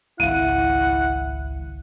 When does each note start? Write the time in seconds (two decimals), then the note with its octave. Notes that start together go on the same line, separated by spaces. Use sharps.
0.20 G#1 C#2 E4 F5 F#5 D#7